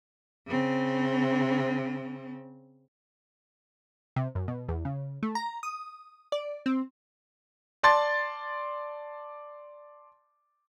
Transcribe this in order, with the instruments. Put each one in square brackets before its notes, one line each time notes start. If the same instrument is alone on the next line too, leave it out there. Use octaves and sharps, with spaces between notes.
[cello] C#3 C4
[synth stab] C3
F#2
B2
E2
C#3
A3
A#5
D#6
D5
C4
[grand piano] D5 A5 C6 A6